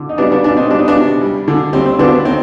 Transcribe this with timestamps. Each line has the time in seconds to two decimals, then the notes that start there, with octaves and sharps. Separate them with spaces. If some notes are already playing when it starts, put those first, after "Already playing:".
Already playing: D3
0.09 D#4
0.18 G3 B3 D4
0.31 B3 D4
0.44 B2 B3 D4
0.57 C4 D#4
0.70 G3 D4
0.79 D#4
0.88 B3 D4
0.96 C3
1.22 G3
1.48 D3
1.73 G3 C4
1.86 C4
1.99 D3 B3 D4
2.12 B3
2.25 D#3 C4